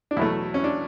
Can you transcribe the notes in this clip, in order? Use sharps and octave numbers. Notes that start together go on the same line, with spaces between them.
D4
E2 B2 F#3 A3 E4
C#4
D4